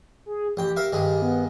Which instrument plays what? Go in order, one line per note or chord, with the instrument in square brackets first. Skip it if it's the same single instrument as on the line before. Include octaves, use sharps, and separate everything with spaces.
[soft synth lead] G#4
[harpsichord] A1 G5 [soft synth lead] G4
[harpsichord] A#4 E5 F5
G2 D#3 G#3
[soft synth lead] B3